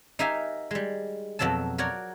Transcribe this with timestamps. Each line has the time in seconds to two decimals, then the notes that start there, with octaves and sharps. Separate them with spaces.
0.19 D#4 G4 A#4 E5 F5 G#5
0.71 G3 G#3
1.39 F2 B2 F#3 A4 A5
1.78 F#4 A#4 C#5 D5